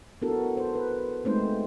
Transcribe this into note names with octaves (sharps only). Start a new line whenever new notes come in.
B3 D4 E4 F#4 A4 A#4
C5
B4
G#3 A3 B3 C4 D#4 C5